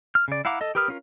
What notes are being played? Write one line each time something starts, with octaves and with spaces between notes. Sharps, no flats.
F6
C#3 D5
E4 F5 F#5 A#5 D6
A4 D#5
G4 A#4 B4 D#6 F6
C#4 F4 A#4